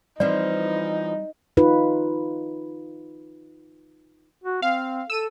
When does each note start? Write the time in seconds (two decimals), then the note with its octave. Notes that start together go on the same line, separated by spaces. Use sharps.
0.20 E3 F3 G3 C4 D#4 D5
1.57 D#4 F4 B4
4.44 F#4
4.62 C4 F5
5.10 A4 E6 D#7 E7